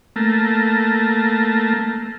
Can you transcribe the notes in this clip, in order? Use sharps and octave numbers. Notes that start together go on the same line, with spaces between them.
A3 A#3